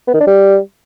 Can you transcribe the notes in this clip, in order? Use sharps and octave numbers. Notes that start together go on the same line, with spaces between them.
B3
D#3
D4
G3